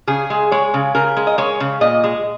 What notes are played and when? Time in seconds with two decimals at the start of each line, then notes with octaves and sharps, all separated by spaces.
0.07 C#3 G#4
0.30 G#3
0.51 G#3 C#5
0.74 C#3
0.95 C#3 A#4
1.17 G#3
1.27 D#5
1.38 G#3 C#5
1.60 C#3
1.81 A#2 D#5
2.04 G#3